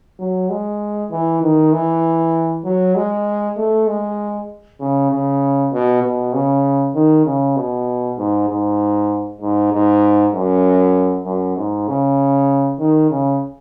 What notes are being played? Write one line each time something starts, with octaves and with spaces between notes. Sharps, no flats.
F#3
G#3
E3
D#3
E3
F#3
G#3
A3
G#3
C#3
C#3
B2
B2
C#3
D#3
C#3
B2
G#2
G#2
G#2
G#2
F#2
F#2
G#2
C#3
D#3
C#3